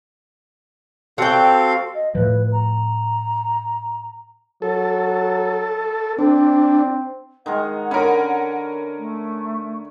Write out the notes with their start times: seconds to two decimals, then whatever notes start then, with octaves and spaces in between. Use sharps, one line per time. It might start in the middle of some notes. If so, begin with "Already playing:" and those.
1.18 C4 F#4 A4 F5 G5
1.95 D#5
2.15 A2 F3 B4
2.52 A#5
4.62 F#3 A4
6.19 C4 D4
7.46 D#3 G#3 A#4 F#5
7.91 D3 C#4 A#4 B5
8.98 A3